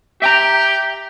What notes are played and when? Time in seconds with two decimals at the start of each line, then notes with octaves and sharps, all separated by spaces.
0.22 G4 E5 G5 A#5